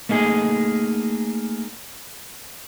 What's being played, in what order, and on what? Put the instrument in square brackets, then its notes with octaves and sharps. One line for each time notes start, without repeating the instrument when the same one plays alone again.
[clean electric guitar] A3 A#3 D#4 G#4